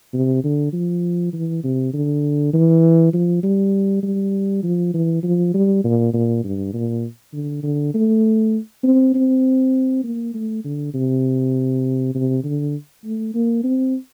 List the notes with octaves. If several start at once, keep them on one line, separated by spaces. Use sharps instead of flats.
C3
D3
F3
E3
C3
D3
E3
F3
G3
G3
F3
E3
F3
G3
A#2
A#2
G2
A#2
D3
D3
A3
C4
C4
A#3
A3
D3
C3
C3
D3
A3
A#3
C4